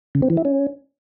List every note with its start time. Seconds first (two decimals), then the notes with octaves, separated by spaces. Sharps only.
0.15 C#3
0.22 C4
0.30 E3
0.37 E4
0.45 C#4